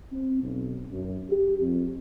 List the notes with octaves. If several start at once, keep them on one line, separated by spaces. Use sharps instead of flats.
C4
B1
F#2
G4
F2